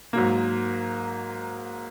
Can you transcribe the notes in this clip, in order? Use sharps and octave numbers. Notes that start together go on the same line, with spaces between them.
G#2 F#3 A#3